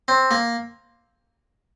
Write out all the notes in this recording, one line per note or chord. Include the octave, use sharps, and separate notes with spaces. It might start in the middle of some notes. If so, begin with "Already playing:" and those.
C4
A#3